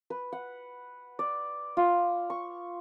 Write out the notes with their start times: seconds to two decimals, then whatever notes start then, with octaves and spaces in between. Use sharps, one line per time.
0.10 B4
0.32 F#5
1.19 D5
1.77 F4
2.30 C#6